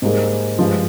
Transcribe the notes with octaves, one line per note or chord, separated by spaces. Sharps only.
G#2 G3 A#3 D#4 G#4
G2 F3 G#3